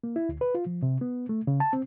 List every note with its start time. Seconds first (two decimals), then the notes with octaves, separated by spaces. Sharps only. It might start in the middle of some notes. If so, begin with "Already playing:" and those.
0.04 A#3
0.16 E4
0.29 D2
0.41 B4
0.55 F4
0.66 F3
0.82 C3
1.01 B3
1.29 A3
1.47 C#3
1.60 A5
1.73 C4